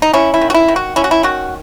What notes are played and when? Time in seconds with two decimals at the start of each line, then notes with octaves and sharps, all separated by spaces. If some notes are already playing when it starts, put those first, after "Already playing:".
0.02 D#4
0.13 C#4 E4
0.34 E4
0.41 D#3
0.50 F#4
0.54 E4
0.68 D#3
0.76 F#4
0.96 C#4 E4
1.04 F#4
1.11 E4
1.23 D#3 F#4